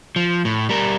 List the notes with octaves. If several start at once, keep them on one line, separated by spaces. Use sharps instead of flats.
F3
A2
G3 A#4